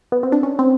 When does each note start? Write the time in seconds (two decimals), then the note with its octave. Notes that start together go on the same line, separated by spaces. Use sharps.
0.12 B3
0.23 C4
0.32 D4
0.43 C#4
0.59 C4